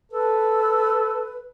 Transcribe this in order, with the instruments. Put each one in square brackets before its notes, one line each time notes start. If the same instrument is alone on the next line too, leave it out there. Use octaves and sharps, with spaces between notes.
[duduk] A4 [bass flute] B4